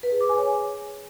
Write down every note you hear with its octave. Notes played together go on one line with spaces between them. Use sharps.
B4
G#4
D6
G#5
C#5